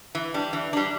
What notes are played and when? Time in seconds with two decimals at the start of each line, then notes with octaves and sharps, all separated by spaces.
0.15 E3
0.34 G3 D4
0.53 E3
0.73 G3 D4